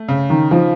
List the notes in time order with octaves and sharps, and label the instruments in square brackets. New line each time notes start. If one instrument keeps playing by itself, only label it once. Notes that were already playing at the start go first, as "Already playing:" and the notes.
Already playing: [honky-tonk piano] A3
C#3
[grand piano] D#3
[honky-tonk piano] D#3 [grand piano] F3